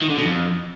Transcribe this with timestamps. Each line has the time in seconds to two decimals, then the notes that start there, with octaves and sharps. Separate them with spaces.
0.02 D#3
0.10 D3
0.17 B2
0.25 F2